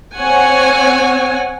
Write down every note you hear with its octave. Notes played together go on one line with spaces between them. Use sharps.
C4 C#5 F#5 G#5